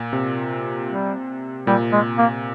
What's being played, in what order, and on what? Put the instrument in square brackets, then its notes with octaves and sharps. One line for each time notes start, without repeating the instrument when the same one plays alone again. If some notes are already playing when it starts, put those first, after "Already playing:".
Already playing: [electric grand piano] A#2
C3
[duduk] G3
[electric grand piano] A#2 [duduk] G3
[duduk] G#3
A#3